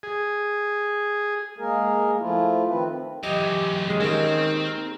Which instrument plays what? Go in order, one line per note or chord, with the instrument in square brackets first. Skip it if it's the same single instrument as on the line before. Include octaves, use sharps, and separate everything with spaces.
[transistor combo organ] G#4
[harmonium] G#3 A#3 G#4 A#4
F3 A3 E4 F4
D#3 C4 B4
[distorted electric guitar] E3 F#3 [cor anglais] G4 [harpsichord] D#5
[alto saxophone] G#3 [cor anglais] C#4
[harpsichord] D#2 G#3 [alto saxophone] D#3 [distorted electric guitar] C4
[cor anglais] A#4